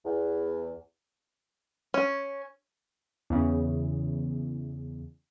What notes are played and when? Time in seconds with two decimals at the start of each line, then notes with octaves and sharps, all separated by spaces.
0.05 E2
1.94 C#4
3.30 E2 C#3